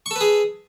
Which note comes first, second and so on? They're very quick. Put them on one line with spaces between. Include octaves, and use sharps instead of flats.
C#6 A4 B4 G#4